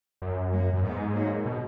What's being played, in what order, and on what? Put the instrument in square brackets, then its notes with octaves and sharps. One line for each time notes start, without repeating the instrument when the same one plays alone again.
[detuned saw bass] F#2
[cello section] F#3 A#3
[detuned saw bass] F#2
[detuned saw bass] G#2 [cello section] G#3 B3
[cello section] F#3 A#3
[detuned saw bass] B2